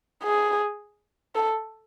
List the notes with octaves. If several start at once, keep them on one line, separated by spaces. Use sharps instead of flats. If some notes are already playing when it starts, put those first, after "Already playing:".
G#4
A4